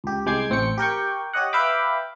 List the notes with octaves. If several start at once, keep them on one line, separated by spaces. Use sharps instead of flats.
C#2 G4
C2 G#3 G5 D6 G#6 C7
A1 C4 G5 C#6 C#7
G4 A#4 G5 C#6
G4 C#5 D#5 F#5
B4 E5 F5 G5 B5 D6